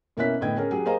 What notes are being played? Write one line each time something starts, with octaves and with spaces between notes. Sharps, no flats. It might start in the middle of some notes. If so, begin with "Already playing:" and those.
B2 A#3 C#4 E4 F#6 B6
A2 D3 B3 D#5 G5 G#6
C#4 G#4 A#4
F#3 G4 G#4
A#3 G#4 C5 D#5 F5 A#5